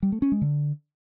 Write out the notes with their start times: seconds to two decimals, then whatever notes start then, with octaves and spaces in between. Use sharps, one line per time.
0.03 G3
0.12 A3
0.22 C#4
0.32 G#3
0.42 D3